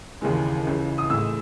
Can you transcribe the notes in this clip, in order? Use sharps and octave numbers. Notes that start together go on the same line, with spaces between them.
D#2 C#3 E3 G#3
C#2 C#3 E3
D#6
A2 E3 G#3 E6